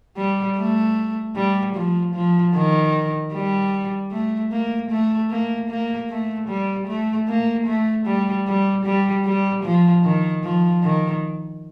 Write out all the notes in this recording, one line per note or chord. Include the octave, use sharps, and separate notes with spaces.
G3
A3
G3
F3
F3
D#3
G3
A3
A#3
A3
A#3
A#3
A3
G3
A3
A#3
A3
G3
G3
G3
G3
F3
D#3
F3
D#3